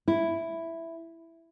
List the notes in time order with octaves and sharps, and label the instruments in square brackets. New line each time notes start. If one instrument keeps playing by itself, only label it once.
[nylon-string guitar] E4